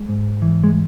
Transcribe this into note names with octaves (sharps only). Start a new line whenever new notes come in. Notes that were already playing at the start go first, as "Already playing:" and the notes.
Already playing: G#3
G#2
E3
G#3